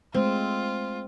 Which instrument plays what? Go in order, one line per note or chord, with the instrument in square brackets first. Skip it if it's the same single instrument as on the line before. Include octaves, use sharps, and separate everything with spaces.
[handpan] G#3 A3 [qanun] C4 [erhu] F4